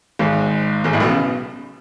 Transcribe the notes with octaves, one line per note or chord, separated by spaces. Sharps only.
G#1 G#2
G#1 G#2
A1 A2
B1 B2
C#3